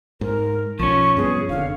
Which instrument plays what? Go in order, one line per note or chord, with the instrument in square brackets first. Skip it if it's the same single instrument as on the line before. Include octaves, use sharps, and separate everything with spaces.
[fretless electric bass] G#2 [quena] A#4
[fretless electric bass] B1 [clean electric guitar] F3 C#4 [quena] C#6
[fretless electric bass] G2 B3 [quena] G#4
[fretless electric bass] F1 D3 [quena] F5